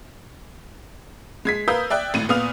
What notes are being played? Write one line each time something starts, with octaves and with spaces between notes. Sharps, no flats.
G#3 G#6 B6
A#4 B4 F5 D#6 E6 G6
D5 E5 G5 F#6
G#1 A2 D#7
A#2 B3 F5 D#6 F6 F7